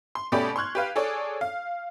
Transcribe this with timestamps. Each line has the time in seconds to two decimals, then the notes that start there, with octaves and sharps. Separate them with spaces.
0.15 C6
0.32 B2 A3 C#4 G4 D5 B5
0.56 C6 C#6 F6 F#6 G#6
0.75 G4 B4 F5
0.96 G#4 A4 C#5 D5
1.41 F5